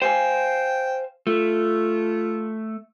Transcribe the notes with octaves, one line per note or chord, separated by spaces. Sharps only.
C5 F5 G5 G#5
A3 F4